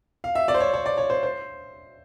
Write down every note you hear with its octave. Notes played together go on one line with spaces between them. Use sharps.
F5
E5
D5
C5
C#5
C#5
D5
C#5
C5
C5